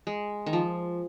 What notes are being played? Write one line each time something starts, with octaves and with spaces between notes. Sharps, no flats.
G#3
D#3
F3